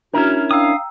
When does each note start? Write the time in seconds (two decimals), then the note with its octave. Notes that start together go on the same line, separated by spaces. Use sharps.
0.14 C#4 D4 E4 F#4 A#4 A#5
0.51 D4 F5 G5 A#5 D#6 E6